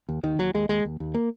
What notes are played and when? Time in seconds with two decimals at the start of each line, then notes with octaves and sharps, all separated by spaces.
0.09 D#2
0.23 D#2 D#3
0.39 D#2 F#3
0.54 D#2 G#3
0.69 D#2 G#3
0.85 D#2
1.00 D#2
1.14 A#3